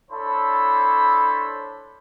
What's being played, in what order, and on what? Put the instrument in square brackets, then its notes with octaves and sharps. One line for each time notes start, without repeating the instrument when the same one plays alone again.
[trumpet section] D4 E4 A4 C5 C#5 B5